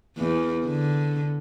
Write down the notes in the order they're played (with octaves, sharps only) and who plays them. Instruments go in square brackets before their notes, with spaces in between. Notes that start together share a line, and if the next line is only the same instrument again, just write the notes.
[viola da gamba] E2
D3